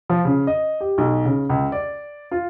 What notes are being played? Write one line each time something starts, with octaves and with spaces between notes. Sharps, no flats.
F3
C#3
D#5
G4
B1
C#3
C#2
D5
F4